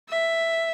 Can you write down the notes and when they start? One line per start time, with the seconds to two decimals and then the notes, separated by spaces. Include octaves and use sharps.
0.09 E5